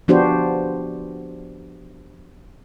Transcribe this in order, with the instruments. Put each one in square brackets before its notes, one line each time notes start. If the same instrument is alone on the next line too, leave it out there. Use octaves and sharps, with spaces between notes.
[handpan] F3 B3 D4 F#4 G4 C5